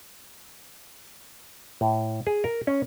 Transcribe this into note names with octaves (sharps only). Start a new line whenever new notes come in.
A2
G#4
A#4
C#4